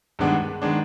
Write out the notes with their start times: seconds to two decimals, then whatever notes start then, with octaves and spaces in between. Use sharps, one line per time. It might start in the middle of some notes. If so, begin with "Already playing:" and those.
0.19 G2 D#3 G#3 B3 D4
0.62 D#3 G#3 B3 D4